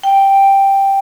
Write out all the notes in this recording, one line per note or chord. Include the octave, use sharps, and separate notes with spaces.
G5